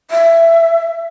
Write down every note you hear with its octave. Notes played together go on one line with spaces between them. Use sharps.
E5